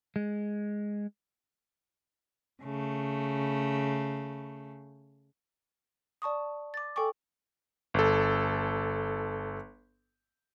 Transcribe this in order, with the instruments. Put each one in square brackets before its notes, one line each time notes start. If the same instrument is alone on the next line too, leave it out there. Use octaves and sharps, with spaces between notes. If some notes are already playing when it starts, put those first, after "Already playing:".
[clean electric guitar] G#3
[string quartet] C#3 A3
[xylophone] D5 A5 C#6 D#6
D6 A6
A4 G5 G#5 C#6 D6
[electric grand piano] G1 A4